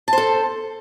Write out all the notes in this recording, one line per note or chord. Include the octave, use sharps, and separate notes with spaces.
A4 C5 A5